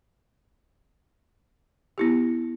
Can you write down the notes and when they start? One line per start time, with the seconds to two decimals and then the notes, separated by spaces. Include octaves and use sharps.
1.98 B3 E4 G4